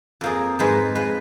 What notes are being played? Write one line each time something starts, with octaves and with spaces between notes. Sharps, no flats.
F2 F3 A#3 G#4
G#2 F3 G#3 B4
F3 G#3 B4